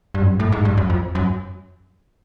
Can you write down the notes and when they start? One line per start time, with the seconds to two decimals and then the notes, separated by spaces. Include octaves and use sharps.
0.14 G2
0.22 F#2
0.30 G2
0.40 A2
0.52 G#2
0.65 G2
0.77 F#2
0.90 F2
1.15 F#2